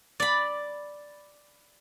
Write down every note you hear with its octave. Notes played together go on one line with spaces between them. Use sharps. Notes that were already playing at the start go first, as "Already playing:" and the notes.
D5 B5